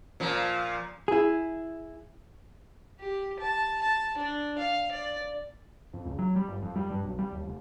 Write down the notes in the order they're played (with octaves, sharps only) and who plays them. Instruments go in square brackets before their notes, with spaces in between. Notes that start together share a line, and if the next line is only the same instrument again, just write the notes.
[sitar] A#2 F3
[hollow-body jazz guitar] E4 G#4
[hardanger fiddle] G4
A5
A5
D4
F5
D5
[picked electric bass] F2
C#2
F#3
G3
G1
F2
G3
G2
B1
G3
D#2
F1